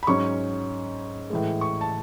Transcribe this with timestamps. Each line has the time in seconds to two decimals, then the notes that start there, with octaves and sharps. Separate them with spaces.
0.03 B5
0.07 G#2 F#3 C#4 C#6
1.30 A2 E3 G#3
1.61 C#6
1.81 A5